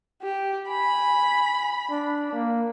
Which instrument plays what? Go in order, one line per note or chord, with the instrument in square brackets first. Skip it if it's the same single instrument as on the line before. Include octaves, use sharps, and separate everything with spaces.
[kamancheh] G4
[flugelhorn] G#5 [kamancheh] B5
[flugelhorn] D4
A#3